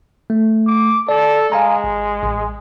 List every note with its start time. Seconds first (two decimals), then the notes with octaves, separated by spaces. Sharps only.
0.30 A3
0.67 D6
1.09 A4 D5
1.52 G#3 F5 G#5 A#5
1.84 G#1
2.23 A1